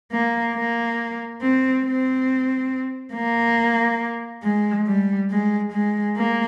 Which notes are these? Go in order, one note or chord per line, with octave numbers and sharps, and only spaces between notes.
A#3
A#3
C4
C4
A#3
G#3
G3
G#3
G#3
A#3